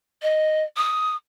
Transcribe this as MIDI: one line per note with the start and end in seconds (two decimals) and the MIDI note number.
0.22 0.63 75
0.76 1.13 87